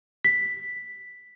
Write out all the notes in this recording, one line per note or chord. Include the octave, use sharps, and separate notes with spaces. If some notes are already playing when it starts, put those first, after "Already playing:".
B6